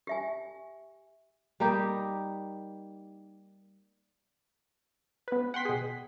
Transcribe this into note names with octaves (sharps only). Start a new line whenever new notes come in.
G4 E5 G#5
G3 A#3 D#4 G4
B3 B4
F#5 G5 C6 B6
B2 G#4